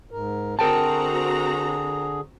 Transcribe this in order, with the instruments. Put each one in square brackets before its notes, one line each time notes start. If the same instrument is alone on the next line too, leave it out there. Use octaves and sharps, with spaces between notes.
[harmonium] G#2 A#4
[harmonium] D3 G#4 [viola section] C4 F#4 A#5 [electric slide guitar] A#4 G5 A5